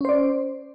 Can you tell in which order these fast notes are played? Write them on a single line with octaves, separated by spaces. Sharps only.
C#4 C5 D5